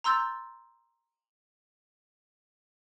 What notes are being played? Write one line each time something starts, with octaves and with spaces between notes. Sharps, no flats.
A#5 C6 E6 G6 A6